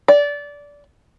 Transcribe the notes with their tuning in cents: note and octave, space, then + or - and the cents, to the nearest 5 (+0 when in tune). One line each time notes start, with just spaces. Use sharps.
D5 -20